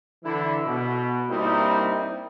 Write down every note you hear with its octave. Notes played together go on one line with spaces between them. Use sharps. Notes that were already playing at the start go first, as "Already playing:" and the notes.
D3 E3 E4
B2
G2 G3 A#3 C4 D#4 E4